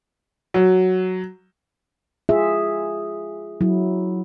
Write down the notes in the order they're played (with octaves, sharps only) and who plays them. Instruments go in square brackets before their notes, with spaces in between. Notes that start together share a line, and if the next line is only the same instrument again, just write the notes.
[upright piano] F#3
[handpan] F4 G#4 E5
F#3 E4